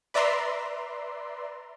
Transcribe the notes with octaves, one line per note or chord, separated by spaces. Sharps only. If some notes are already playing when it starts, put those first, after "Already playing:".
B4 D5 E5 A#5 C6